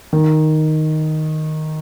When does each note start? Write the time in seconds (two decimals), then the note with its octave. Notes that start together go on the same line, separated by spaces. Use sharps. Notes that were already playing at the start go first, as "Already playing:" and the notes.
0.13 D#3